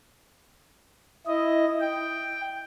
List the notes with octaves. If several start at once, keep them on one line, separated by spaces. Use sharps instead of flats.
E4 D#5
G5